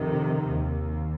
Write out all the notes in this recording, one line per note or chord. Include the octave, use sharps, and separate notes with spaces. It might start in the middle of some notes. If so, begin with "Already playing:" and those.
Already playing: F2 C3 D#3
D#2